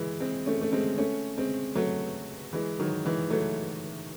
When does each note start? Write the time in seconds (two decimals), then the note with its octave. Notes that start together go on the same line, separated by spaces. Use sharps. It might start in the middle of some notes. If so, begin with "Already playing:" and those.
Already playing: E3 G#3
0.20 G#3 C4
0.46 A3 C#4
0.61 A3
0.72 G#3 C4
0.98 A3 C#4
1.38 G#3 C4
1.75 F#3 A3
2.53 E3 G#3
2.79 D#3 F#3
3.05 E3 G#3
3.30 F#3 A3